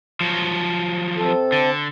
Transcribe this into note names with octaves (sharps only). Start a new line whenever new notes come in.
F3 F#3
C3 A4
D3